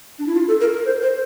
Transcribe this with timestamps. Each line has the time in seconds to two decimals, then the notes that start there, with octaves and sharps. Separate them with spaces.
0.19 D4
0.27 E4
0.35 F4
0.48 A4
0.61 A#4
0.72 A#4
0.85 C5
1.02 C5